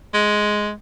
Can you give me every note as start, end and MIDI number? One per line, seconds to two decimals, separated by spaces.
0.14 0.71 56